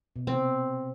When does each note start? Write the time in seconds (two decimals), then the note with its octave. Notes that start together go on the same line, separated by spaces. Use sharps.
0.16 B2
0.27 C3 C4